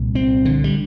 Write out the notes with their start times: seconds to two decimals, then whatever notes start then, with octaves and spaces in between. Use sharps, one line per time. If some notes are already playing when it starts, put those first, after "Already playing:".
Already playing: C2 A#2
0.15 C4
0.45 D3
0.64 G3